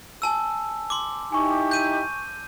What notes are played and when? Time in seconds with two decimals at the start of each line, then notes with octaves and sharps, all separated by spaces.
0.22 G#5 A5 E6
0.90 C6 D6
1.32 D#4 E4 G4 G#5 C#6
1.71 G6 D#7